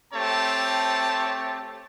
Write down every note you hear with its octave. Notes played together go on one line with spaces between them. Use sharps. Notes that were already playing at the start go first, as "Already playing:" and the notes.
A3 C4 G4 C#5 A5